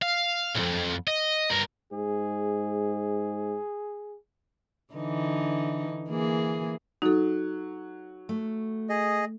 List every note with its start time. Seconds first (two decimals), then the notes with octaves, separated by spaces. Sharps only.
0.02 F5
0.55 B1 F2
1.08 D#5
1.51 G2 A#4
1.92 G#2 G#4
4.94 D3 E3 D#4
6.09 E3 A#3 G#4
7.02 F#3 D#4 A4
8.29 A3
8.89 G#4 D#5